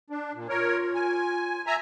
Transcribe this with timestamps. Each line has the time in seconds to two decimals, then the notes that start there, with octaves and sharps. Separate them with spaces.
0.10 D4
0.34 A#2
0.49 F4 A#4 C#5
0.95 G#5
1.67 E5 G#5 A#5